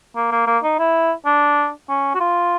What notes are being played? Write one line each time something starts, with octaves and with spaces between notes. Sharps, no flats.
A#3
A#3
A#3
D#4
E4
D4
C#4
F#4
F4